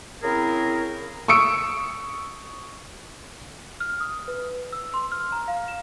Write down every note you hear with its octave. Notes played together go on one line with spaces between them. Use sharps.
C#3 C4 E4 G#4 A#4
C#6 D#6 E6 C#7 D7
F6
D#6
B4
E6
C6
F6
A#5
F5
E7